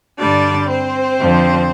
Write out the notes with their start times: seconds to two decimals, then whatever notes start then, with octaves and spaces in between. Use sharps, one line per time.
0.20 G2 D3 G3 D4 D5
0.70 C4 C5
1.20 F2 D3 F3